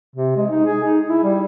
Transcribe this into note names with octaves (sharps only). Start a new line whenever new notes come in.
C3
G#3
D#4
G#4
D#4
E4
G3